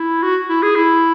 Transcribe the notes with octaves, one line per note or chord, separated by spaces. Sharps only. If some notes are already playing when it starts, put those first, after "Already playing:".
Already playing: E4
F#4
E4
G#4
E4